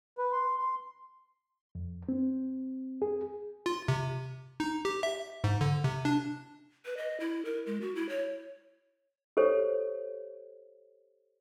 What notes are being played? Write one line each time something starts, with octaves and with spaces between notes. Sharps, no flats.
B4
C6
C6
F2
C4
G#4
F4
C3
D#4
G4
E5
G#2
D3
C3
D4
B4
D#5
E4
A#4
G#3
F#4
E4
C#5
G4 A4 C5 C#5